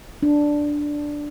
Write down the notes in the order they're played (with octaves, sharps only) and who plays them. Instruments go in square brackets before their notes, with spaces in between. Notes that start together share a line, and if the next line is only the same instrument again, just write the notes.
[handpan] D4